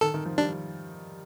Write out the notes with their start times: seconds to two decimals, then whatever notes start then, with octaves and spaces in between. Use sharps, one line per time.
0.01 D#3 A4
0.14 D#3
0.25 F3
0.38 G3 D4